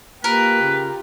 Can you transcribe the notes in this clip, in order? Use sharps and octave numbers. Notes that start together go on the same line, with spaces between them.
A#3 F4 G4 A#4 B4
C#3